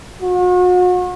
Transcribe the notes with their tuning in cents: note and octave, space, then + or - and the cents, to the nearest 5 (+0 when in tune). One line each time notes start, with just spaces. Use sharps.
F#4 -40